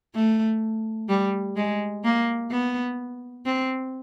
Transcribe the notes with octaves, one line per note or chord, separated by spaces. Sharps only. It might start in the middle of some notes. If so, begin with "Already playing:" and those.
A3
G3
G#3
A#3
B3
C4